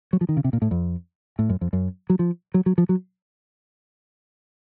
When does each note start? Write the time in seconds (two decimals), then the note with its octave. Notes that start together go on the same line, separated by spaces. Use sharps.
0.13 F#3
0.21 F3
0.29 D#3
0.37 C#3
0.44 C3
0.53 A#2
0.62 A2
0.71 F2
1.39 A2
1.49 F#2
1.61 F2
1.73 F#2
2.10 F#3
2.19 F3
2.54 F#3
2.66 F#3
2.78 F3
2.89 F#3